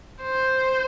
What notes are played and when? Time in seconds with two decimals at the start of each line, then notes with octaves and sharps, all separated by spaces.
0.23 C5